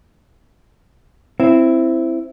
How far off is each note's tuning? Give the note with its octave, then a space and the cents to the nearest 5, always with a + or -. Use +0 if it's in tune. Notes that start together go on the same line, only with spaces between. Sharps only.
C4 +0 E4 +10